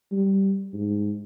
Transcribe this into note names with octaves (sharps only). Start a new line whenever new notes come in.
G3
G#2